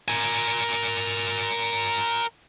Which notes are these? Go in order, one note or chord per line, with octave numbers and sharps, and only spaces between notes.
A#4 G#5